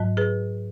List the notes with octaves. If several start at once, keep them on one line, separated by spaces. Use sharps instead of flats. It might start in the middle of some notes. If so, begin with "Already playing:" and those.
Already playing: G#2 F#3
G#4 B4